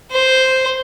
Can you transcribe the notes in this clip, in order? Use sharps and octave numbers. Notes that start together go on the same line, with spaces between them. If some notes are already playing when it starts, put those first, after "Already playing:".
C5